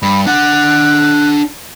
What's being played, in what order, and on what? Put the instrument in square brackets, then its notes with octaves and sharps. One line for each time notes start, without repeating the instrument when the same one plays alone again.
[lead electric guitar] G2 [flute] B5
[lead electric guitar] D4 F#5 [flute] F#6